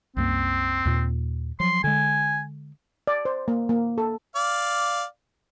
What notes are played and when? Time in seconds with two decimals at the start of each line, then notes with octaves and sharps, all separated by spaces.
0.17 C2 F#2 A#3 C4
0.85 D#2 A#2
1.60 F3 F#3 C6
1.84 D3 G#3 G#5
3.07 D5
3.25 C5
3.48 A#3
3.69 A#3
3.98 A4
4.36 D5 F5